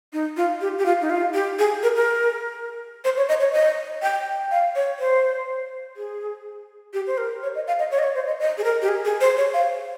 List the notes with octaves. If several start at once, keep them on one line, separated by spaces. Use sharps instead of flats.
D#4
F4
G4
G4
F4
D#4
F4
G4
G#4
A#4
A#4
C5
C#5
D#5
C#5
D#5
G5
F5
C#5
C5
G#4
G4
C5
A#4
C#5
D#5
F5
D#5
C#5
D#5
C#5
C5
D#5
D#5
G#4
A#4
G4
G#4
G#4
C5
C#5
F5